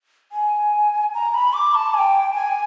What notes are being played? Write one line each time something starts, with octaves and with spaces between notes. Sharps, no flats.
G#5
A#5
B5
D6
A5
G#5
G5
G#5